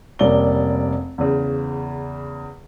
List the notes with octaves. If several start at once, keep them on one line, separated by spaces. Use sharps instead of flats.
F1 G3 A#3 C#4 D5 G7
E2 C#3